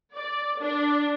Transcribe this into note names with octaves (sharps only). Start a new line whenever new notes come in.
D5
D4